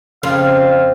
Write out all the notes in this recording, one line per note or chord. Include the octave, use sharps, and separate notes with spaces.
F2 C#3 C4 C5 F5